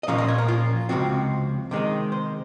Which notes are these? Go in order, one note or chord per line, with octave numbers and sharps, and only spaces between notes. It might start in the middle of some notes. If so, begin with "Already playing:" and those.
D#5
A#2 F3 A#3 C#4 F5
D#5
C#5
A#4
F4
C#2 C3 F3 C4 F#4
C3 D#3 G#3 D#4
C5